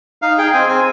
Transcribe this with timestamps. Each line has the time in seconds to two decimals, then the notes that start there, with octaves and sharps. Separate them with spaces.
0.22 D#4 F5
0.38 G#4 G5
0.54 C4 G#5
0.69 C4 G#5